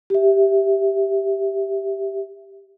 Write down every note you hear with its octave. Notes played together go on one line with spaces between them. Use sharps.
G4 E5